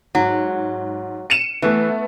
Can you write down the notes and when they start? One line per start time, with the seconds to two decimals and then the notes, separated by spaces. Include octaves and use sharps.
0.15 G#2 F#3
1.30 C#7 D#7 E7
1.62 E3 A3 B3